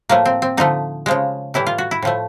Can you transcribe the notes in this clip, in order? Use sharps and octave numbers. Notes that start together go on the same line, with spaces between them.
A2 F3 A3 A#3
C4
C4
D3 F3 A3 D#4
C#3 F3 G#3
A2 E3 G3 E4
F4
F#4
E4
A2 F3 A3